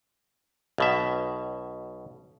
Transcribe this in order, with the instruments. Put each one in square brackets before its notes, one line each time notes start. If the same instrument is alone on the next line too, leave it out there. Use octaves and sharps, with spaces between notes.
[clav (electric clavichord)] B1 B2 E5